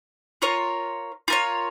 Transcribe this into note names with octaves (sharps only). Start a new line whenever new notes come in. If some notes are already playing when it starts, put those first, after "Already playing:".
F4 A#4 C#5
F4 A#4 C#5